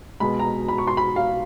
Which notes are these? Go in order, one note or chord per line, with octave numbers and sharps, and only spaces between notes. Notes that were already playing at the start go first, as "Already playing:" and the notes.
B2 G#3 B5
A#5
B5
C#6
C6
B5
F5